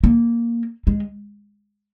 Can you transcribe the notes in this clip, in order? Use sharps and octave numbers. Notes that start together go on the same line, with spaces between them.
A#3
G#3